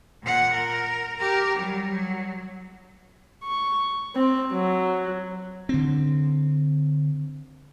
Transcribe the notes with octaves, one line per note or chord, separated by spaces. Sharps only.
A#2 F#5
A#4
G4 A#4
F#3 G3
F#3
C#6
C4
F#3
D3 C4